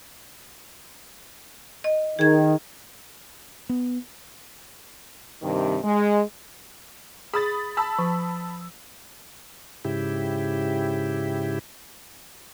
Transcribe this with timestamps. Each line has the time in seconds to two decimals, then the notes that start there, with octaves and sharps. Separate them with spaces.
1.84 D#5
2.19 D#3 G#4 G#6
3.69 B3
5.42 G2 C3 D#3
5.83 G#3
7.34 G#4 B5 D#6 A6
7.77 A5 B5 E6
7.99 F3
9.85 G#2 C#3 E4 G4